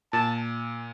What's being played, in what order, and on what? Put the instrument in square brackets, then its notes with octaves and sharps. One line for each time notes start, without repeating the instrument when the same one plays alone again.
[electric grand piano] A#2 [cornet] A5